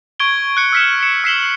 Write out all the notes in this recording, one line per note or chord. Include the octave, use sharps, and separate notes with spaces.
C#6 G#6 D7 G7
F#6 C#7
E6 F6 B6 C#7 E7
C#7 E7
E6 B6 C7 E7 F#7 G7